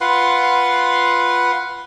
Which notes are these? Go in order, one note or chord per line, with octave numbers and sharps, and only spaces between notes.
F4 B4 F#5 C6